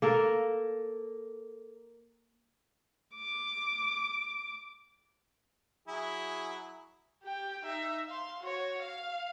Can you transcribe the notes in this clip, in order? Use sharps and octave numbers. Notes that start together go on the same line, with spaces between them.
A#3 A4 A#4
D6
F#3 E4 G#4
G4 G5
D#4 E5
F5 C6
F#4 C#5
F5